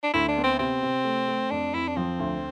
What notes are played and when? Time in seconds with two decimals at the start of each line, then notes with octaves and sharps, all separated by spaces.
0.04 D4
0.14 D2 E4
0.28 D4
0.37 B3
0.44 C4
0.59 C3 C4
0.83 C3
1.04 A3
1.28 A3
1.51 F2 D4
1.74 F2 E4
1.88 D4
1.97 F3 C4
2.19 D2